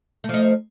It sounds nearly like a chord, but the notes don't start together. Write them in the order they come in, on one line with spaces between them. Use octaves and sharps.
A3 F3 D#4